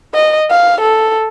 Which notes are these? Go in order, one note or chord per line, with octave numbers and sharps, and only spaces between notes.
D#5
F5
A4